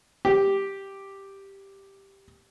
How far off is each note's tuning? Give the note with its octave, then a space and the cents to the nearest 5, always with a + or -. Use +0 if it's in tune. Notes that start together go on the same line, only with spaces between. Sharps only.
G4 +0